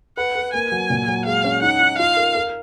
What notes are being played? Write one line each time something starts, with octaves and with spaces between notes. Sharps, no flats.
B4 F#5
B4
A#3 G#5
F#3
A#2
F#3
G#3 F5
C#4
D#4 F#5
D#4
F4 F5
A#4
A#4